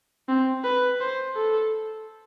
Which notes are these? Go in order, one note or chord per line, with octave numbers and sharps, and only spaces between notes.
C4
B4
C5
A4